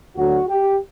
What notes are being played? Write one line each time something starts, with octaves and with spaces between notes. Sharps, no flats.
D2 D3 F#3 F#4
G4